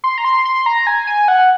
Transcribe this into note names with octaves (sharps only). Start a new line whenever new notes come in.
C6
A#5
C6
C6
A#5
G#5
G#5
F#5